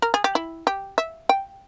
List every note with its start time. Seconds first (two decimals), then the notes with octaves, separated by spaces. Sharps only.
0.02 A#4
0.14 G#4
0.24 G4
0.35 E4
0.67 G4
0.98 E5
1.29 G5